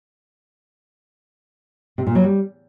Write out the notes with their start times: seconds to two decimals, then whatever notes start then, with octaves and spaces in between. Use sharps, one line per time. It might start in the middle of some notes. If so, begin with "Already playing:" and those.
1.98 C3
2.07 A#2
2.15 F#3
2.24 G3